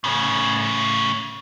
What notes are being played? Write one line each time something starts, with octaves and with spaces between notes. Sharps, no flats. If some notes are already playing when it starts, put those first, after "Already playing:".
A2 C#3